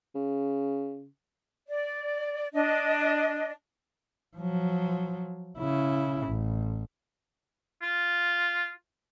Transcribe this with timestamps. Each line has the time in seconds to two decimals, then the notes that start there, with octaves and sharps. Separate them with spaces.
0.15 C#3
1.68 D5
2.54 D4 D#5
4.37 F3 F#3
5.58 C#3 E4
6.27 A1
7.82 F4